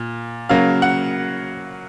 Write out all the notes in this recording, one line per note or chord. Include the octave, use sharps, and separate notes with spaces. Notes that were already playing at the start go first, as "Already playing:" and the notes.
Already playing: A#2
C#3 F#3 A#3 F5
F#5